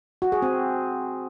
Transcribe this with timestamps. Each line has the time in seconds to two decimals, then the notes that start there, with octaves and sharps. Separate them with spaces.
0.22 F#4
0.32 G#4
0.42 C4